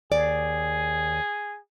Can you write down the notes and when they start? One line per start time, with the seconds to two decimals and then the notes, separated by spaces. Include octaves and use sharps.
0.12 D#2 G#4 D5